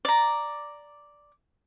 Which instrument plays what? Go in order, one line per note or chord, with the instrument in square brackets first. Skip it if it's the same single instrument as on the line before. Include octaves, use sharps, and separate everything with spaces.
[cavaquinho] D5 A#5